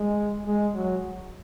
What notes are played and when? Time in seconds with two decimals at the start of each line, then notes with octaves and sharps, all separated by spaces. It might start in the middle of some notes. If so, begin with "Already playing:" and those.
Already playing: G#3
0.46 G#3
0.75 F#3